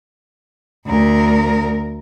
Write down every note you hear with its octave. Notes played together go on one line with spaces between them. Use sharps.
D2 A#4